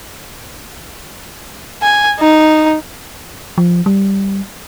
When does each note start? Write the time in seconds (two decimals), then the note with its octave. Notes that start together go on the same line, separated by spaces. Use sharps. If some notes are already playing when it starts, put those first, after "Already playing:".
1.82 G#5
2.20 D#4
3.58 F3
3.86 G3